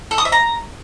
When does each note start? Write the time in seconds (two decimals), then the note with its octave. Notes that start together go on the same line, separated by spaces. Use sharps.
0.11 A4
0.18 D#6
0.25 E5
0.32 A#5